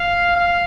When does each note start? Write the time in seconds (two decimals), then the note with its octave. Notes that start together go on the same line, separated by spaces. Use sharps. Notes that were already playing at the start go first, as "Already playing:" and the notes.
Already playing: F5
0.36 F5